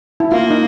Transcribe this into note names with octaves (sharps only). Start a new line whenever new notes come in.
E4
A#3 F4
D#4